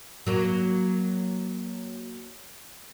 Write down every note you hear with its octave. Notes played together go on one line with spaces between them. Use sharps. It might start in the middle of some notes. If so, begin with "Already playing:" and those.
F#3 A#3